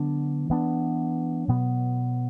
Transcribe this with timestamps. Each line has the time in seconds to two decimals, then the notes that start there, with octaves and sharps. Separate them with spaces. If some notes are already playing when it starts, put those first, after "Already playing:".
Already playing: D3 F#3 B3 D4
0.49 E3 B3 D4
1.48 B2 F#3 B3